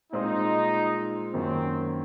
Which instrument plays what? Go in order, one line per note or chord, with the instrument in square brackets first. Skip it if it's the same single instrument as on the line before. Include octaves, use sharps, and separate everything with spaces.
[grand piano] A#2 G#3 C4 F4 G#4 [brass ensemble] D#4
[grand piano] F#2 D#3 A#3 D#4 [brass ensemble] C4